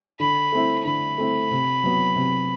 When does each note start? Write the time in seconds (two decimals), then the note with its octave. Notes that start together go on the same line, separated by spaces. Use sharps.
0.20 D3 B5
0.52 A3 C4 E4
0.85 D3 B5
1.18 A3 C4 E4
1.51 C3
1.84 F#3 B3
2.16 C3